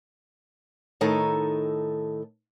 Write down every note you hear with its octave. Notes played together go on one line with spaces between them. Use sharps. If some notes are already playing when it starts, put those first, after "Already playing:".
A2 D#3 D#4 A4 G#5